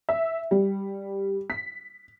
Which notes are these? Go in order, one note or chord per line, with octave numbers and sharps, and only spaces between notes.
E5
G3
B6